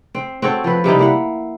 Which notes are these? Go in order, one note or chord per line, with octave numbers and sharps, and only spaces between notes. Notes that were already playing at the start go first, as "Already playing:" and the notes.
C4
C4 F#4 A4 C#5
F3 B4
C3 G3 D#4 E4
A#3 E4 F#5